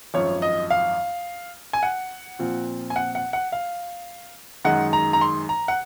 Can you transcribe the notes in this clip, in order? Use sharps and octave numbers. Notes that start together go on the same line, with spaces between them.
G#1 F#2 F3 C#5
D#5
F5
G#5
F#5
A#2 F3 C4 F4
G#5
F#5
F#5
F#5
F5
F#2 D#3 G#3 D#4 F#5
A#5
A#5
C6
A#5
F#5